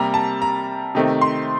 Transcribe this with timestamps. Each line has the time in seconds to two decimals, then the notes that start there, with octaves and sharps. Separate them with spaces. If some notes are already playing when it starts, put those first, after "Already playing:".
Already playing: C3 G3 A#3 A#5
0.14 A5
0.42 A#5
0.95 C3 D#3 A3 C4
1.21 C6